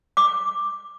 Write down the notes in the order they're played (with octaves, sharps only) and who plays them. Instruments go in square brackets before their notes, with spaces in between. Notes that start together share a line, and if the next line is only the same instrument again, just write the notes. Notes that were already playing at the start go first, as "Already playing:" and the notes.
[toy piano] D6